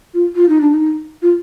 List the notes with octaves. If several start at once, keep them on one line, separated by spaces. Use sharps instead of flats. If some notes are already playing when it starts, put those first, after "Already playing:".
F4
F4
D#4
D4
D#4
F4